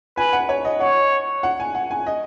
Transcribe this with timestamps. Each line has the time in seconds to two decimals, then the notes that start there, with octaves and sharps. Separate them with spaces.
0.17 B4 G#5
0.33 F#5
0.49 C#5
0.65 D#5
0.80 C#5 F#5
1.43 F#5
1.60 G#5
1.75 F#5
1.91 G#5
2.06 D#5